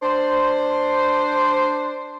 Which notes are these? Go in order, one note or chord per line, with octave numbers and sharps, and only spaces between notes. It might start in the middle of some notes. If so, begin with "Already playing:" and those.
D4 C5